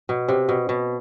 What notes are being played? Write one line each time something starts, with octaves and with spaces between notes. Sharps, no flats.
B2
C3
B2
B2